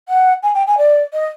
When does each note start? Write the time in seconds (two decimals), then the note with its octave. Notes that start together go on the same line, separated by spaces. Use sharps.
0.09 F#5
0.43 G#5
0.55 G5
0.67 G#5
0.78 D5
1.13 D#5